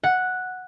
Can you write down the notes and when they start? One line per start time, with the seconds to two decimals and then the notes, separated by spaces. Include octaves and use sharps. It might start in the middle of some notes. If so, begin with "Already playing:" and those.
0.03 F#5